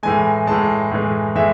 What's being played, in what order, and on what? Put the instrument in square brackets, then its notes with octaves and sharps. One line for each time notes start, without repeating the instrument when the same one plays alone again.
[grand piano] A2 E3 G#3 G#5
A2 E3 G#3 A5
A2 E3 G#3
A2 E3 G#3 E5